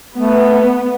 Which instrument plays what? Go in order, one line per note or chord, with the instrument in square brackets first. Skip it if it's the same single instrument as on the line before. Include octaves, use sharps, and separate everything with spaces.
[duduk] A3 [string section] B3